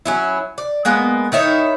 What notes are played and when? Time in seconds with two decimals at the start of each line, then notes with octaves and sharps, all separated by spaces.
0.06 F#3 C#4 E4
0.58 D5
0.85 G#3 A#3 B3
1.32 D#3 D#4 E4 C#5